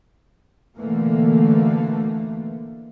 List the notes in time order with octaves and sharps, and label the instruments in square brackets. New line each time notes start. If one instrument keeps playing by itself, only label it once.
[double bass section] B2 D3 E3 A3 A#3